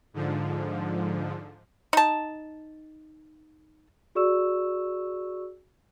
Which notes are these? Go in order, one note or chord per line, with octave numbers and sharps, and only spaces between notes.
G#2 D3 F3
D#4 A5
F#4 G#4 D5 C#6 E6 E7